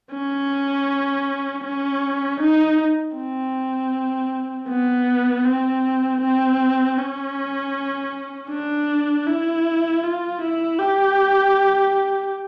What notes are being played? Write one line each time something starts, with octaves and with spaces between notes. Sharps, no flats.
C#4
C#4
D#4
C4
B3
C4
C4
C#4
D4
E4
F4
E4
G4